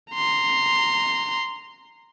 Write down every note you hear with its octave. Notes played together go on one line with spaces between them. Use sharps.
A#5 C6